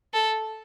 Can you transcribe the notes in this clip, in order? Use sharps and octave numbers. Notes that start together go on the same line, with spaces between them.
A4